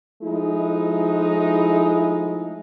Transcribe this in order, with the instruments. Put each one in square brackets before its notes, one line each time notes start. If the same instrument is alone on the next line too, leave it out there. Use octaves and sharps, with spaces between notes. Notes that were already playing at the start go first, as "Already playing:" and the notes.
[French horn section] F3 G#3 A3 D#4 E4